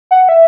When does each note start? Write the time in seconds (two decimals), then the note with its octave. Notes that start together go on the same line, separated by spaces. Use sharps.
0.11 F#5
0.29 E5